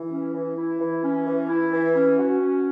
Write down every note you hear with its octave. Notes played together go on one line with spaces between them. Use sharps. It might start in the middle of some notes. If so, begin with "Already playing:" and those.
Already playing: E3
C#4
E3
E4
E3
C#4
E3
E4
E3
C#4
F#4
C#4